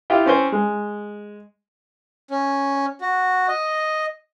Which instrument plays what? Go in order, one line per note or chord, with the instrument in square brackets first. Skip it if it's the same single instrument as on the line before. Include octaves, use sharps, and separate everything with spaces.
[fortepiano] E4 F4 G4
C4 C#4 C5
G#3
[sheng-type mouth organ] C#4
F#4
D#5